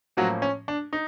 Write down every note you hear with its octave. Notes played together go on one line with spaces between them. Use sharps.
A2 F3 F#3 A#3 C#4 F#4
C#4
D4
D#4